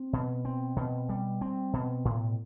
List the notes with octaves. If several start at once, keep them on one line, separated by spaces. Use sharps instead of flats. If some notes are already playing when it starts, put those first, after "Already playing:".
Already playing: C4
B2
C4
B2
G3
C4
B2
A2